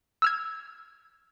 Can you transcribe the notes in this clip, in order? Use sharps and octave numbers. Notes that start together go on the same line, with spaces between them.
E6 F6 G#6